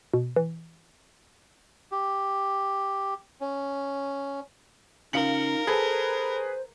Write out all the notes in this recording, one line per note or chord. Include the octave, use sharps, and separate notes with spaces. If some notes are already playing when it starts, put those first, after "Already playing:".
B2
E3
G4
C#4
C#3 D#4 F4 A#4 C#7 F#7
G#4 A4 B4 C5